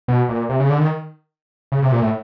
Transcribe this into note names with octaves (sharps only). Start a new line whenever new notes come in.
B2
A#2
C3
C#3
D3
D#3
C#3
C3
A#2
A2